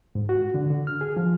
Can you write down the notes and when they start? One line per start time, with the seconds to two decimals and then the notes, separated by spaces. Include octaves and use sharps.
0.15 G#2
0.29 F#4
0.54 D3
0.70 D3
0.87 F6
1.01 G#4
1.17 F3